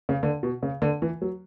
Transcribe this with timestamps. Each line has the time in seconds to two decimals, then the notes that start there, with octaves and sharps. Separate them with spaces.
0.09 C#3
0.23 D3
0.43 B2
0.63 C#3
0.82 D3
1.02 E3
1.22 F#3